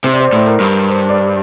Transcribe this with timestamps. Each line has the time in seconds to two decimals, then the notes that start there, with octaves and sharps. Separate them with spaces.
0.04 C3 C5
0.13 D5
0.20 C5
0.29 D5
0.33 A2 C5
0.47 A#4
0.60 G2
0.89 C5
1.10 D5